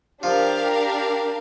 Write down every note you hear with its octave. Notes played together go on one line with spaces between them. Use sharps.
F3 D4 G4 A#4 F5